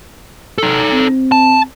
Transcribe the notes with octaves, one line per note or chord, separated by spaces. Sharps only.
D#4 A4
C4
A5